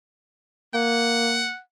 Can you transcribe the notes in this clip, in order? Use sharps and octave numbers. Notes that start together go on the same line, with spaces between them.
A#3 F#5